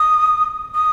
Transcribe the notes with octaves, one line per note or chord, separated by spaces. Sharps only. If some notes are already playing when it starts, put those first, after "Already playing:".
Already playing: D#6
D#6